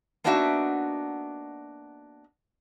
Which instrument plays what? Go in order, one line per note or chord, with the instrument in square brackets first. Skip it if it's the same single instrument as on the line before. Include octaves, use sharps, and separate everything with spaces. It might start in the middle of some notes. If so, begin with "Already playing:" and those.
[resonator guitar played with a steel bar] A#3 B3 D4 D#4 F#4 E5